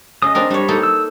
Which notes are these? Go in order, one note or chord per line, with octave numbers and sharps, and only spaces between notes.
C#3 D#5 D#6
C4 D4 A#4
G3 D4 C#5
A#3 D#4 A4
E6